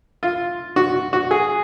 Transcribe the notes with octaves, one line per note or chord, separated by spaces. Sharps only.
F4
F#4
F#4
G#4